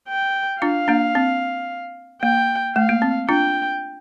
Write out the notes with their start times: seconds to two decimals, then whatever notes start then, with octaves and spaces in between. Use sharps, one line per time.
0.09 G5
0.62 D4 F4 F5
0.88 A#3 D4
1.15 C4
2.22 A#3 G5
2.76 A3 F5
2.89 A#3
3.02 C4
3.29 D4 F4 G5